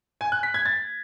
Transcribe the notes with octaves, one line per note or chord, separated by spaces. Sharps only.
G#5
F#6
B6
G#6
A6